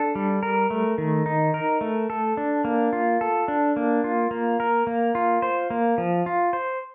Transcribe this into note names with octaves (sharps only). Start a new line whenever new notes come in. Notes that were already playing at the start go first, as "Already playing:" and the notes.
Already playing: D4 A4
G3
A#4
A3
D#3
D#4
A#4
A3
A4
D4
A#3
F4
A4
D4
A#3
F4
A#3
A#4
A#3
F4
C5
A#3
F3
F4
C5